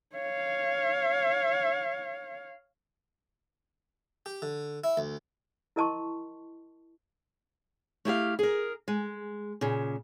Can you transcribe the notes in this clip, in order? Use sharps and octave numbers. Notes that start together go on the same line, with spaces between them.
C#5 F5
G4
D3
E4
D2
E4 A#4 D#5 A5 C6 C#6
A3 E4 G4 F5
G#4 A#4
G#3
A#2 C#3